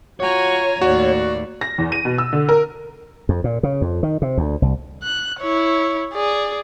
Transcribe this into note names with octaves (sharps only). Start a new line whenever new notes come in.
F4 F#4 C#5 G#5 A#5
D#2 A2 F#4 D5
A#6
E2
D#7
B2
E6
D3
A#4
F2
A#2
C#3
F2
D#3
C3
D2
C2
F#6
E4 C#5
G#4 D5